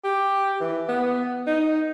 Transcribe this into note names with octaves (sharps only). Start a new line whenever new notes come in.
G4
E3
B3
D#4